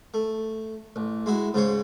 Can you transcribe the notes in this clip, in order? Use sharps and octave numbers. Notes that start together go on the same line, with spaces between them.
A3
A1
G#3 E4 F#4
G#2 C#3 C5 C#5